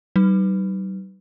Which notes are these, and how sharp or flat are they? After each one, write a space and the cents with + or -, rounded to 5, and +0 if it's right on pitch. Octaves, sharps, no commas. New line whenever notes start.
G3 -40 D#4 +0 B4 +0